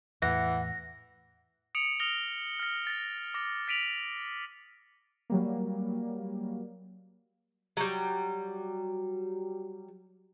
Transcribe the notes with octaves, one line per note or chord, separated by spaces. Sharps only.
E2 A2 E3 F#5 A#6
D#6 C#7 D7 F7 F#7
D#6 F6 A#6 F7 G7
F6 A#6
A6 A#6
D6 A#6
A6 B6 D7 D#7 F7 F#7
F#3 G3 A#3
F#3 G3